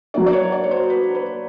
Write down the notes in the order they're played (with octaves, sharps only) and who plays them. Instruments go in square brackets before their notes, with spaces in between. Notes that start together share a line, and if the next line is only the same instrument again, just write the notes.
[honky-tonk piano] F#3 A#3 D4 [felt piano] D5
[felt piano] D5
C#5
D5
C#5
C5
B4
B4